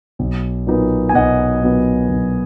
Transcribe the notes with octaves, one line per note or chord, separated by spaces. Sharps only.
B1
A#2 F#3 B3 D#4
G#5
B1 D#5 F#5
A#2 F#3 B3 D#4
B1